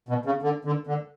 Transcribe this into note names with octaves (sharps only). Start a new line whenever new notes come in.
B2
C#3
D3
D3
D3